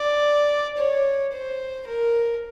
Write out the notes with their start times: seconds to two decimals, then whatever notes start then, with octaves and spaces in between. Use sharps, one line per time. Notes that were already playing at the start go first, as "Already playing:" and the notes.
Already playing: D5
0.77 C#5
1.32 C5
1.87 A#4